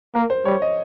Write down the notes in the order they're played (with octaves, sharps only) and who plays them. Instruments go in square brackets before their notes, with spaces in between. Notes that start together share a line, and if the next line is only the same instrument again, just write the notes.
[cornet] A#3 [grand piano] A#4
[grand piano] C5
[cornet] G3 [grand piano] C#5
[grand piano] D#5